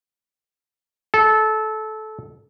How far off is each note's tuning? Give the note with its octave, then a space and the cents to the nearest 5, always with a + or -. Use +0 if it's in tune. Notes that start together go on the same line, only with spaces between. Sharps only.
A4 -20